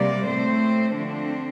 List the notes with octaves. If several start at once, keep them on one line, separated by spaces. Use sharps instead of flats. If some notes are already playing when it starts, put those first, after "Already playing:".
Already playing: C3 G3 A#3 D5
A2 A3 C4 C5
D3 F3 A3 C4 D4